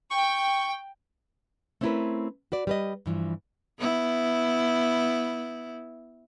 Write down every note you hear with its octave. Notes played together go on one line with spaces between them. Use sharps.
G5 C#6
A3 C4 C#4 E4 A#4 B4
F#4 B4 D5
G3 B4 D#5
G2 E3 F3
B3 E4